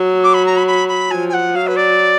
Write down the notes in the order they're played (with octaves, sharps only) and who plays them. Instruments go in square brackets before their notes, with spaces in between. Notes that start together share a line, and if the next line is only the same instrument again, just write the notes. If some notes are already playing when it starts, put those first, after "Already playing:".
Already playing: [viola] F#3
[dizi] D6
B5
A#5
B5
B5
B5
[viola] F3 [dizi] G#5
[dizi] G#5
F#5
[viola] F#3 [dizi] F5
[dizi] B4
D5